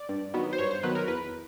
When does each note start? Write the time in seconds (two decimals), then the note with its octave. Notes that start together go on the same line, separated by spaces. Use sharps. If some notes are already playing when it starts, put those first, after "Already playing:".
Already playing: D5
0.09 G2
0.34 D#3 F#3 B3
0.53 C5
0.58 G2 C#5
0.71 C5
0.83 D#3 F#3 B3 B4
0.95 A#4
1.08 E2 B4